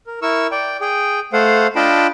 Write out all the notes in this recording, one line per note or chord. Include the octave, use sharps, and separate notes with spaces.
A#4
E4 A#4 C#6 E6
D5 G5
G#4 G5
A3 A4 C5 F5 F#5
D4 F4 D#5 G5 A5 B5